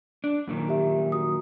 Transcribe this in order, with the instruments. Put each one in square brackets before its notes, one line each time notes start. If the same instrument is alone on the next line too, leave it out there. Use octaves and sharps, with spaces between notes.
[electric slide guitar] D4
F#2 A#2 D#3
[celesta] G4 E5
F#4 D#6